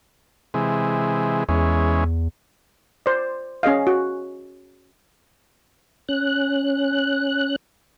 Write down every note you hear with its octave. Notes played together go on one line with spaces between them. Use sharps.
C3 E3 G#3
E2 E3 G#3 C#4
C5 D5
C#4 G#4 D#5 F5
F#4
C#4 F#6